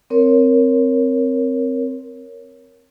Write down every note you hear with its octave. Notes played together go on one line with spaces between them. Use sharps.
C4 A#4 C#5